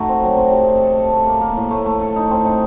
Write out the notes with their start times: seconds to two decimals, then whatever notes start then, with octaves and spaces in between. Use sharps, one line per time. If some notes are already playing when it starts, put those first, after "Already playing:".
Already playing: A3 D#4 F#4
0.09 C4
0.23 F#3
0.37 C4
0.52 C3
0.67 C4
0.83 A4
0.97 A4
1.12 A3
1.27 A#3
1.41 A#3
1.57 A2
1.71 A3
1.86 A3
2.01 A4
2.16 D#4
2.31 C4
2.45 D#4